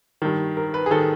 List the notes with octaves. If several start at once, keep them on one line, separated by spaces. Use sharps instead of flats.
G2 D#3
A#4
B4
G#4
D#3 A4